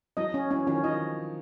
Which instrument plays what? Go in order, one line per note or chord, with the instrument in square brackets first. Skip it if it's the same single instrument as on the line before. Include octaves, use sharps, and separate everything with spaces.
[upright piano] E3 F#3 [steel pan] D#5
[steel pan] C#4
[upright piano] E3 F#3 [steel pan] C#4
[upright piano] D#3 F3 [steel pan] C#4
[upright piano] D#3 F3 [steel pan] D#5